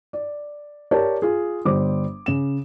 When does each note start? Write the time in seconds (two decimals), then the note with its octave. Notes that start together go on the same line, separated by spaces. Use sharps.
0.13 D5
0.91 G4 A#4 C#5 D5 A5
1.22 F4 G#4
1.65 G1 G3 C5 D6
2.26 C#3 E7